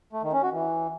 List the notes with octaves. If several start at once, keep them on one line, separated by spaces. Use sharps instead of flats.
A3
D#3
C#4
F#4
E3